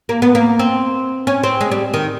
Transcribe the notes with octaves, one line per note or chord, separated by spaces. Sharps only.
A#3
B3
A#3
C4
C#4
C4
G#3
G3
D#3